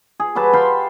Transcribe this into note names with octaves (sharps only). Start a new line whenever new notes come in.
G#4
F#3 G4 B4 A5
F5 G5 B5 C6